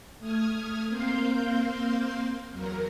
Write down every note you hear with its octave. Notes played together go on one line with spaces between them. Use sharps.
A3 D#6 F6 G#6
A#3 C4 F5 C6 G6
E2 F#3 A#4